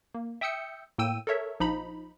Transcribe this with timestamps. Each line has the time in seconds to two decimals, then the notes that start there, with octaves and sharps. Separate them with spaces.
0.14 A#3
0.41 E5 G5 D#6 E6 G6 C#7
0.98 A2 A#3 G5 E6 D#7
1.27 A4 A#4 C#5 E5
1.60 A#1 F3 D#4 A#5 B5